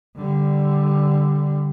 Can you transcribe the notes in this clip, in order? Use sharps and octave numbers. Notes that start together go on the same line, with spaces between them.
D3 G3